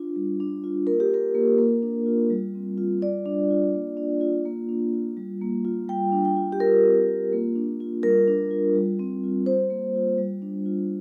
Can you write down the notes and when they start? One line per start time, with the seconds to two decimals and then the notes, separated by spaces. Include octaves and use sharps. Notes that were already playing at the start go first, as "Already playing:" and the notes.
Already playing: D4 F4
0.16 G3
0.40 D4
0.64 F4
0.87 A#3 A#4
1.00 G4
1.11 F4 A#4
1.35 A#3
1.58 A#3
1.83 D4
2.06 F4
2.30 G3
2.55 C4
2.78 F4
3.02 G3 D5
3.25 D4
3.51 F4
3.74 A#3
3.97 D4
4.21 F4
4.45 A#3
4.69 D4
4.93 F4
5.17 G3
5.42 A#3
5.65 F4
5.88 G3 G5
6.12 D4
6.25 G5
6.37 F4
6.52 G4
6.60 G3 A#4
6.85 C4
7.08 F4
7.33 A#3
7.55 D4
7.80 F4
8.03 G3 A#4
8.27 D4
8.51 F4
8.75 G3
8.99 C4
9.24 F4
9.46 G3 C5
9.70 A#3
9.95 F4
10.18 G3
10.42 D4
10.66 F4